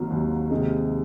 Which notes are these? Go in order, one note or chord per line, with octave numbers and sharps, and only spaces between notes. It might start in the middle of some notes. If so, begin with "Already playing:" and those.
Already playing: G#1 F#3 A#3
D#2
C3 G#3